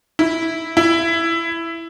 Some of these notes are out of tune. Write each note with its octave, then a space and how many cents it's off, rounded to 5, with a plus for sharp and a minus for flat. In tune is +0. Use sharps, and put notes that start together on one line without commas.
E4 -5
E4 +10